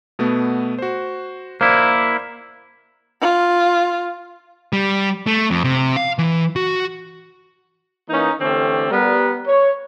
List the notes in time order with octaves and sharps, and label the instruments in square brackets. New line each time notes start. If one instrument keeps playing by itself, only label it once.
[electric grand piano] B2 A3 B3
F#4 C5
[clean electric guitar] A#3 E4 [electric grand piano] C5 D5
[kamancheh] F4
[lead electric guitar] G3
A3
F2
C3
F5
E3
F#4
[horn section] E3 A#3 C#4 D#4
D3 E3 A3 C4 C#4 G4
G3 B3 A#4
C#5